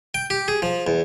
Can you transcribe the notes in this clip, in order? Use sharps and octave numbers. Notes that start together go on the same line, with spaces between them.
G5
G4
G#4
F3
E2